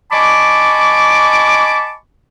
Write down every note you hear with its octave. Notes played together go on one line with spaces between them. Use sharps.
D#5 G#5 A5 B5 C#6 D6